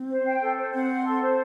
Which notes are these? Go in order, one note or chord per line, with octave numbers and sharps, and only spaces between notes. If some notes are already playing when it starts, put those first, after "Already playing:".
Already playing: C4
C5
G5
A4
C5
C4 F#5
C6
A4
C5